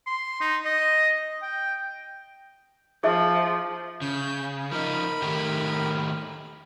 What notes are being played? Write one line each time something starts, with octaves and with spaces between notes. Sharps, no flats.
C6
D#4
D#5
G5
F3 G#4 E5
C#3 G6
F3 D#4 A#4 B5
D#3 A3 G4